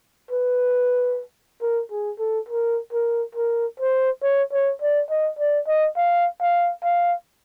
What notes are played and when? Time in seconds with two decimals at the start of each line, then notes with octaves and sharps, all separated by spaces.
0.31 B4
1.62 A#4
1.91 G#4
2.19 A4
2.49 A#4
2.93 A#4
3.35 A#4
3.80 C5
4.23 C#5
4.53 C#5
4.82 D5
5.10 D#5
5.39 D5
5.68 D#5
5.97 F5
6.41 F5
6.84 F5